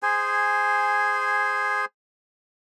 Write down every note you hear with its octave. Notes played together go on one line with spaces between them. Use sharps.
G#4 C5 G#5